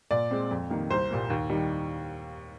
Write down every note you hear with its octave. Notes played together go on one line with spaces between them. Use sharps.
A#2 D5
G#3 C4
F2
D#3 G3 A#3
C2 C5
A#2 G3 A#3
D#2
D#3 G3